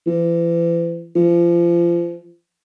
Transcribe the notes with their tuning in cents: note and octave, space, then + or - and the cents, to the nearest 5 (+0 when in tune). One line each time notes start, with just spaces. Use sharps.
E3 +40
F3 -30